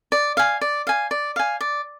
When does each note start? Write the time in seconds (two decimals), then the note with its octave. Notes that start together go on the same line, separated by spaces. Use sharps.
0.12 D5
0.37 F5 G#5
0.61 D5
0.87 F5 G#5
1.11 D5
1.36 F5 G#5
1.61 D5